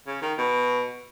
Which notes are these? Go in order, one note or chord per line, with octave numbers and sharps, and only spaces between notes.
C#3
D#3
B2